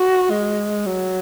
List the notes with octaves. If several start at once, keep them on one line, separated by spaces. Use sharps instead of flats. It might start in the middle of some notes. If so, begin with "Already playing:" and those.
Already playing: F#4
G#3
F#3